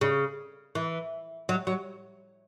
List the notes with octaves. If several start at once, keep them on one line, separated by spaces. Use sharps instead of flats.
C#3
E3
F#3
F#3